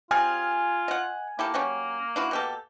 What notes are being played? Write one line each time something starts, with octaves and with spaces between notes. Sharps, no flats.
G3 C4 F4 G#4 G#5 F6
D#5 F#5
A#3 E4 G4 A4
F#3 G3 C#4
D4 E4 F#4
B2 G4 A4